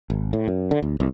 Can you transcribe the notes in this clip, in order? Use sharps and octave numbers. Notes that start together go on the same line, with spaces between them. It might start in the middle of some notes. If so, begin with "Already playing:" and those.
G#1
A2
F#2
D3
D2
C2